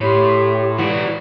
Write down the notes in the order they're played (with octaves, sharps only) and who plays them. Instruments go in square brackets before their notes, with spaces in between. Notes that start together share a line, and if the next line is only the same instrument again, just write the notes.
[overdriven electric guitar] A2 [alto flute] G4 [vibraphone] C#5 B5 C6
[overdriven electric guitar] E3 F#4 [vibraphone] D5 F#5